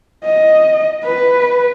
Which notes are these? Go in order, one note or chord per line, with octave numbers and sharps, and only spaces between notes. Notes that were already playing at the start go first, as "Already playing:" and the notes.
D#5
B4